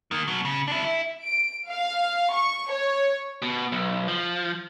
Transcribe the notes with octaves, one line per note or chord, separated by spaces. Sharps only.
D#3 A#3
B2 F#3
C#3
D4 E4
E4
D7
F5
C#6
C#5
B2
B1
F3